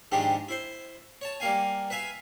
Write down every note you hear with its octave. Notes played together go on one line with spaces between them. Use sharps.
G#2 D#3 F3 G#3 D4 G4
E4 C5
C#5 A5
G3 A#3 F5 G#5
B4 E5 F5 G#5